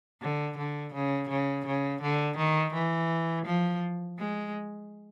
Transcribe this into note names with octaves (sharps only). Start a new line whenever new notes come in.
D3
D3
C#3
C#3
C#3
D3
D#3
E3
F3
G#3